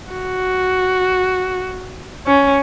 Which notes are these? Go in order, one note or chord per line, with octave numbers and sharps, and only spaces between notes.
F#4
C#4